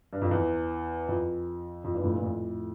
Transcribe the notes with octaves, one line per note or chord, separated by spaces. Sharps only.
G2
F2
E2
F2
F2
E2 G2
F2 A2
G2 A#2
F2 A2